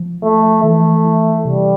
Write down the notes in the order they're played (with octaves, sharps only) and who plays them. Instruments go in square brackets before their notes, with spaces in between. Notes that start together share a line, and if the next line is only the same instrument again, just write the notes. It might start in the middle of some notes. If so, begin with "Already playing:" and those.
Already playing: [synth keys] F3
[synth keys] F3 [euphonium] A3
[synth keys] E3 [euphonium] A3
[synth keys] E3
[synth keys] C3 [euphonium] G3